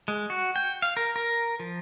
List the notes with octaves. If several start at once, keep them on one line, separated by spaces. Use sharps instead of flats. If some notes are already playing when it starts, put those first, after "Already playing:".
G#3
F#4
G5
F5
A#4
A#4
F3